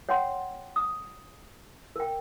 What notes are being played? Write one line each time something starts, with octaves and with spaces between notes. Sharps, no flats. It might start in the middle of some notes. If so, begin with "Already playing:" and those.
C#5 F#5 G5 C6
D#6
A#4 G5